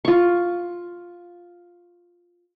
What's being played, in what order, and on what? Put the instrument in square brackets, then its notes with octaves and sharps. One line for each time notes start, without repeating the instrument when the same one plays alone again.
[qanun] F4 C#6